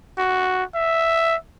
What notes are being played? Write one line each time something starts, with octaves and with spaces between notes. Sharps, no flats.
F#4
E5